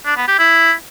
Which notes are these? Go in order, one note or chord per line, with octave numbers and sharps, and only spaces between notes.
D4
B3
G4
E4